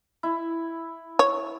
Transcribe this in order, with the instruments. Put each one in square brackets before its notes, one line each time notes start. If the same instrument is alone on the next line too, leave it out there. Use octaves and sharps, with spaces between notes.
[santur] E4
[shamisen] C#5